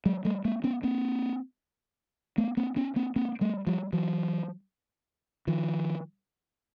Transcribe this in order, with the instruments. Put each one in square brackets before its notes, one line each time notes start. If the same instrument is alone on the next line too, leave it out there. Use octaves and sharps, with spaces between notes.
[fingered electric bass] F#3 G#3
G3 A3
G#3 A#3
B3 C#4
A#3 C4
A3 B3
A#3 C4
B3 C#4
A#3 C4
A#3 C4
G3 A3
F3 G3
E3 F#3
D#3 F3